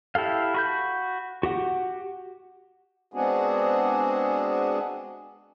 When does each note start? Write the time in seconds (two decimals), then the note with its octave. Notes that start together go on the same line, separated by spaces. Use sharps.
0.15 E4 G4 A4 F5
0.54 F#4 B5 G6
1.43 F#4 G4 F#5
3.14 G#3 B3 C4 D4 F#4 G#4